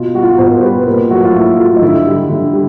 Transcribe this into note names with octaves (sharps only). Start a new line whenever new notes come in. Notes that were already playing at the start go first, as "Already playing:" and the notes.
Already playing: B2 F4
G3 F#4
F4
F#4
B2 C5
A#4
G3 B4
B4
A#2 A#4
F#3 A3 F#4
F4
A#2 E4
F#3 A3 F4
D#4
D3 E4
G3
D3
G3